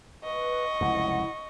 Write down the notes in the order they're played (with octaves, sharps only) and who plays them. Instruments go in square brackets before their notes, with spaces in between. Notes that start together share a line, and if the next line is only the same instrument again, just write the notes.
[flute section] B4 [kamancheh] D#5 C#6
[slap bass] F1 C#2 F#2 [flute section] E4 F#5